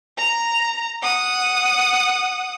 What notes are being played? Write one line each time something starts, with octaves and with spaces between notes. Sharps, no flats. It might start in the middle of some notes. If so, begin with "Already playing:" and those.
A#5
F#5 D#6